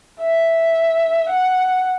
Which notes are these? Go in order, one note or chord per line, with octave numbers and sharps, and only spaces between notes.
E5
F#5